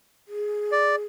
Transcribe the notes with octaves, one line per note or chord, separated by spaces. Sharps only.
G#4
D5